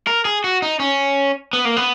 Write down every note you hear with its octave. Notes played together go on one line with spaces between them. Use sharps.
A#4
G#4
F#4
D#4
C#4
B3
A#3
B3